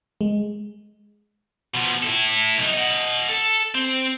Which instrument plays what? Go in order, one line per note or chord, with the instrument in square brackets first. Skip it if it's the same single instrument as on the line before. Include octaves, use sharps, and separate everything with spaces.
[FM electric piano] G#3
[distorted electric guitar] B2 F3
E4 A4
B1 D#4
D#5 F#5
A4
C4